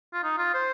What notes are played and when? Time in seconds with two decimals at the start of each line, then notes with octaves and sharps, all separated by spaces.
0.13 F4
0.24 D#4
0.38 F4
0.54 C5